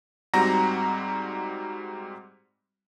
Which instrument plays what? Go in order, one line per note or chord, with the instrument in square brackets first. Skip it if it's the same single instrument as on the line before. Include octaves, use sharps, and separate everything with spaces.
[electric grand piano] G#2 G3 C4 F#4 A#5 A#6